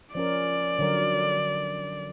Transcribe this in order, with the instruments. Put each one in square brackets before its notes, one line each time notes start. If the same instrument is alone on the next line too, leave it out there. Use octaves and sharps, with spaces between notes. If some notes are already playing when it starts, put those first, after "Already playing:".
[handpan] F3 C#4 A#4 [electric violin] D5
[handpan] D3 F#3 A#4